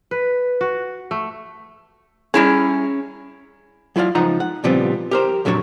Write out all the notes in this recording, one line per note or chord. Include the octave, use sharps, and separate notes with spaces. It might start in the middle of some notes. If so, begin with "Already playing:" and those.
B4
F#4
A3
G3 C#4 E4 G#4 A#5
F#3 E4 F4 D5 F5
C#2 F3 D#4 F#5 A#5
F#5
A#2 C#3 F3 G3 B3 C4
G4 A#4 C5
F2 A#2 F#3 D4 A#4 C#5